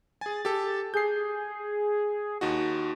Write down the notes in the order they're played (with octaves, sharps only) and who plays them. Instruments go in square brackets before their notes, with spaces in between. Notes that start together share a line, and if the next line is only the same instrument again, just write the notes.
[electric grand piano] G#4 G#5 [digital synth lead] A6
[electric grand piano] G4 A4
[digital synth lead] G#4 [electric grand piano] G6 C7
[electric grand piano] D#2 D#4 F#4